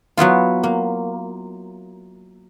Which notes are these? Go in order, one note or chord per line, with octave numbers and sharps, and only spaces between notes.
F#3 B3 E4 F4
A#3